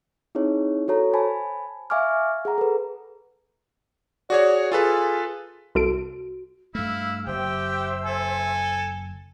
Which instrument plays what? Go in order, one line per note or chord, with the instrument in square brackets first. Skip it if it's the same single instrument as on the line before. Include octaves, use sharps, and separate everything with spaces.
[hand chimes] C4 D#4 E4 G#4 C#5
F#4 A4 C#5 A#5
C5 G#5 A5 B5
E5 F5 G#5 C#6 D6 F6
G#4 F#5 A#5
A4 B4
[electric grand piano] F#4 G#4 C#5 [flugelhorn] D5
[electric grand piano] F4 A4 B4 [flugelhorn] G#4
[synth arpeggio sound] C2 A4 D7 [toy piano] F#4
[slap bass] G2 A3 [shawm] E4 [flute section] F5 E6 F6
[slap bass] F#1 [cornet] G4 [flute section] C5 E5 E6 [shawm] G5
[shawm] A4 [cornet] G#5